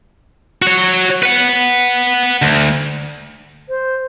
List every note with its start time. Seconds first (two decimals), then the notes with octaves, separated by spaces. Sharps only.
0.62 F#4 C#5
1.23 B4 F#5
2.42 D2
3.69 C5